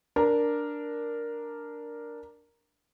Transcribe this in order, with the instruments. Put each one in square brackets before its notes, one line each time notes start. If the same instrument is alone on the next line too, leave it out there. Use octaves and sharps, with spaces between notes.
[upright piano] D4 A#4